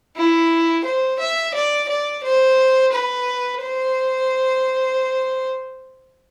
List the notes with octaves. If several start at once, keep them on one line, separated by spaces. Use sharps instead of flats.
E4
C5
E5
D5
D5
C5
B4
C5